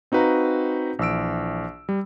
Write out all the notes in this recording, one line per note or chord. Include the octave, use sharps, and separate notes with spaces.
C4 D#4 F#4 B4 F5 A#5
A#1 E3 E6 D7
G3